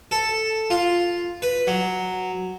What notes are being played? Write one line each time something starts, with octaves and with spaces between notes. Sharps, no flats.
A4
F4
B4
F#3